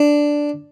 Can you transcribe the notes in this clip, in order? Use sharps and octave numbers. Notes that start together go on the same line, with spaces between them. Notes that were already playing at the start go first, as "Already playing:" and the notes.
Already playing: D4